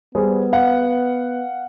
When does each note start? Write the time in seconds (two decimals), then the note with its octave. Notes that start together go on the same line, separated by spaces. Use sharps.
0.15 G3 B3 G#4 C5
0.53 F5 F#5